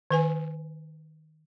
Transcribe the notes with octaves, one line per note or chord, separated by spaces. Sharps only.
D#3 B4 G#5